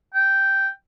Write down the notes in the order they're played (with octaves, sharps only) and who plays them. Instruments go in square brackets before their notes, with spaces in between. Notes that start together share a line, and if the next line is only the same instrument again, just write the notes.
[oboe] G5